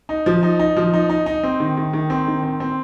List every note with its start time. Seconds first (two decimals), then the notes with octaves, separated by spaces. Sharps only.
0.09 D#4
0.26 F3
0.43 D#4
0.59 D#4
0.77 F3
0.93 D#4
1.09 D#4
1.26 D#4
1.43 C4
1.60 D#3
1.77 D#3
1.93 D#3
2.10 C4
2.27 D#3
2.43 C4
2.60 C4